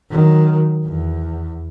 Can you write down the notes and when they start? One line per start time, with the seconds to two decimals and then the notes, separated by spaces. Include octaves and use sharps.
0.11 D#3 F#3
0.85 E2